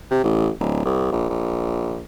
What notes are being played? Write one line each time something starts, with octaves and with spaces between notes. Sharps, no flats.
C3
A1
D1
C2
A#1
A#1